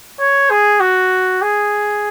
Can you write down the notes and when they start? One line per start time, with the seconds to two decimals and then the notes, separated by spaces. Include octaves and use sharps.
0.20 C#5
0.50 G#4
0.81 F#4
1.42 G#4